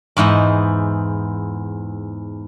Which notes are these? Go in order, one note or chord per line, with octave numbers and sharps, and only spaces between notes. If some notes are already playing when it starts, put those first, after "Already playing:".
E2 G#2 E4 D#5